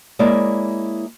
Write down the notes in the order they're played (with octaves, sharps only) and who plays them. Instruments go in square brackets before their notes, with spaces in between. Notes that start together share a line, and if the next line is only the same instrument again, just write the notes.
[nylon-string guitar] G#3 A#3 E4 C#5 D5 E5